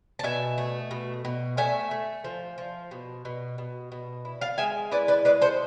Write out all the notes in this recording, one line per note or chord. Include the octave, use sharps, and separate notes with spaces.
A5
B2 E5 G#5
A3
B2
B2
A3 E5 G#5
A3
F3
F3
B2
B2
B2
B2
E4
F5 A5
G#3 E5 G#5
E4 B4 D5
B4 D5
G#3 B4 D5
A4 C5